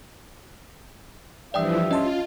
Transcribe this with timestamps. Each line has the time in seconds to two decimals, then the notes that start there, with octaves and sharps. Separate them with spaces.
1.54 G2 E3 F3 D5 E5 G5 D#6
1.91 C#4 F4 D#5 A5 C6